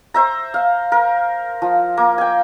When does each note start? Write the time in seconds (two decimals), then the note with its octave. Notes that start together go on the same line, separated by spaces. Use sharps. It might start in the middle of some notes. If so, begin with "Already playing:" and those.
0.14 C5 E5 A#5
0.54 F5
0.92 A#4
1.62 F3
1.97 A#3
2.18 G5 G#5